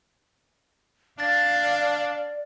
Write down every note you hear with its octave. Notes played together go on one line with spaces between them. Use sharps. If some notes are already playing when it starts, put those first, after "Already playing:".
D4 D5 F5 A6